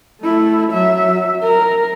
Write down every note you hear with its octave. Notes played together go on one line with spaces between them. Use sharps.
A3 E4
F#3 E5
A#4